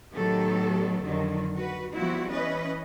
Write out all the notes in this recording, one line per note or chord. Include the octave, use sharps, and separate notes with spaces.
A2 D#3 F#3 B3 G4 A4
F2 D3 D#3 F#3
F#4 B4
F3 G3 B3 C4 E4 F#4
E3 C#4 B4 D#5